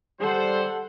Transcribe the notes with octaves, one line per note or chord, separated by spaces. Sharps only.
G3 A4 C5 F#5